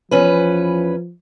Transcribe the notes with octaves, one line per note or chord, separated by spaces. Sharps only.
E2 F3 C#4 B4